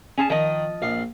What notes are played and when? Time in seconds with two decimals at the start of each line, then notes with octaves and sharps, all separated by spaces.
0.17 C#4 G#4 A5
0.30 D#3 F3 D#5
0.82 A#1 F5